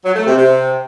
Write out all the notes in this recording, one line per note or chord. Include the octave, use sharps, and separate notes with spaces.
F#3
A3
C3
C3